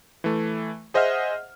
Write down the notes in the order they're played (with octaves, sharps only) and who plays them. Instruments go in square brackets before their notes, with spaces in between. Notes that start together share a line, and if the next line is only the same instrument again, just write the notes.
[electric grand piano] E3 A3
G#4 C5 D#5 E5 F#5 F6